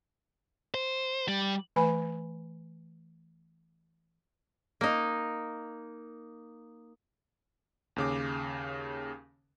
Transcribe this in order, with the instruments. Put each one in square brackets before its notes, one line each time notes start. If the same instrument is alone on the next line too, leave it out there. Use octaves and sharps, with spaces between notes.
[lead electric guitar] C5
G3
[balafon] E3 A3 B4 G#5 B5
[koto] A#3 D#4
[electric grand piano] D#2 C#3 D6